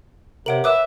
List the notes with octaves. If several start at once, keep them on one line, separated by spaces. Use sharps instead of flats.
C3 A#4 C#5 F#5 D7 F#7
B4 E5 D6 D#6 F#6